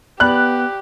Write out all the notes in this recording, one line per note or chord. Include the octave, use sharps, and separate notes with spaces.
B3 G4 D5 B5 F#6 F#7